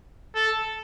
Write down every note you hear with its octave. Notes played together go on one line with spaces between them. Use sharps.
A4